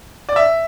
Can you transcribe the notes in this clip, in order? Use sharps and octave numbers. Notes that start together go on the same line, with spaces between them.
D5
E5